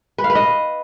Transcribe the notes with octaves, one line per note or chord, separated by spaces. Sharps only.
B4
F5
B4
D#5